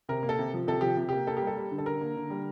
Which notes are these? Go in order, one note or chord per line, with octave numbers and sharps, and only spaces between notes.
C3 A#4
A#3
A4
C3
F3
C3 A4
F3 G4
C3
A#3 G4
A#3 A4
G3 G4
A4
G3
D3
A4
D3 A#4
A#3
D3
G3